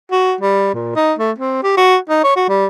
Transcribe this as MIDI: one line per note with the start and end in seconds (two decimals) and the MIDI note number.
0.11 0.34 66
0.41 0.73 55
0.74 0.91 46
0.96 1.13 63
1.19 1.31 57
1.39 1.60 60
1.63 1.75 67
1.77 1.97 66
2.09 2.23 63
2.24 2.36 73
2.36 2.47 66
2.49 2.66 55